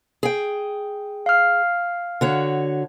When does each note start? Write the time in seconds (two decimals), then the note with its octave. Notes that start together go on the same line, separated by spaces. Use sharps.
0.23 G#4 G5
1.26 F5 F6
2.21 D3 F#4 C#5